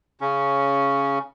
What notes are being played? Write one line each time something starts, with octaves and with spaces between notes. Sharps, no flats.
C#3 C#4